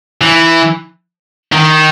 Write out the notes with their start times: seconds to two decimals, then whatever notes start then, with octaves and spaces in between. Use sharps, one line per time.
0.21 E3
1.52 D#3